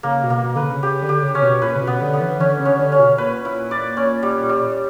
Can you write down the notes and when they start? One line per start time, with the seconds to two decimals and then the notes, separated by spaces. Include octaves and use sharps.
0.03 C#3 A#3
0.23 B2
0.30 A#3
0.44 B2
0.56 D3 B4
0.63 C#3
0.83 C#3 G4
1.02 D3
1.09 G4
1.22 C#3
1.35 C#4
1.42 B2
1.62 A#2 B4
1.75 C#3
1.81 B2
1.87 B3
2.01 D3
2.13 B3
2.20 E3
2.39 D3 C#4
2.59 C#3
2.65 C#4
2.79 D3
2.92 C#4
2.99 B2
3.18 A#2 B4
3.45 E4
3.71 D5
3.97 C#4
4.23 G3
4.49 G3